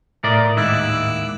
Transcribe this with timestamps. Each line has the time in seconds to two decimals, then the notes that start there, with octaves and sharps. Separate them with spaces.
0.24 A2 A#4 D5 E5 D#6
0.57 D#2 G#2 E4 D6 E6 F#6